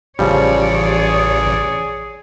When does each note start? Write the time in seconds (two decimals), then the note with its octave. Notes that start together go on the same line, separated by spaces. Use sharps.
0.19 A1 C#3 F3 G3 C#5 D5
0.71 G#4